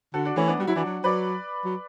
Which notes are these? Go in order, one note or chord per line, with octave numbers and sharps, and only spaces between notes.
D3 F#4 A4
D4 F#4
E3 A3 C#4
B3 D4
G3 F#4
F#3 E4
E3 D4 F#4
F#3
F#3 B4 D5
F#3